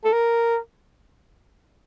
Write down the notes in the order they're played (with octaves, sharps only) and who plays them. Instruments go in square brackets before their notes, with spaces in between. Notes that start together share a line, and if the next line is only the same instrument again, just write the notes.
[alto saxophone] A4
A#4